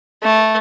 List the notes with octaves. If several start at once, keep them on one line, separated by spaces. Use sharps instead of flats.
A3